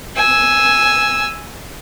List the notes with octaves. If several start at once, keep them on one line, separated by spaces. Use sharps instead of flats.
G#5 E6